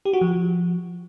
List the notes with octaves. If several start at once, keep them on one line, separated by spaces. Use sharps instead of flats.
G4
F#4
F3